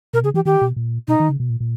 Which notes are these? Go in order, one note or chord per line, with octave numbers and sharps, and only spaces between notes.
B2 A#4
C#3 G#4
E3 G4
D#3 G4
B2
A#2
B2 D#4
D#3
C#3
B2
A#2
A#2